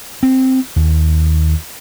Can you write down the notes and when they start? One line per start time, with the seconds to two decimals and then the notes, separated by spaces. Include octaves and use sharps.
0.23 C4
0.76 D#2